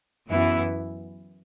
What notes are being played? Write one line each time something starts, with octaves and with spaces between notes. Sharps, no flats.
F#2 E3 B3 E4